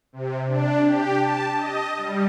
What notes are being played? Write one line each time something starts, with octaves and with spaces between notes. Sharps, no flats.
C3
D4
G4
A5
D#5
G3